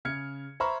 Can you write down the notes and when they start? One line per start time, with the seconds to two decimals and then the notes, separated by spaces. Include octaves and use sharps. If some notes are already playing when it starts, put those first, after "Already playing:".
0.05 C#3 F6 G#6 C#7
0.60 C5 E5 A#5 B5 C#6 F6